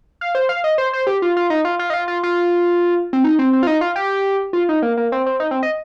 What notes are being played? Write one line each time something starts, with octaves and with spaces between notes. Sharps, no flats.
F5
C5
F5
D#5
C5
C5
G4
F4
F4
D#4
F4
F4
D#4
F4
F4
F4
C4
D#4
C4
C4
F4
D#4
F4
G4
F4
D#4
A#3
A#3
C4
C4
D#4
C4
D#5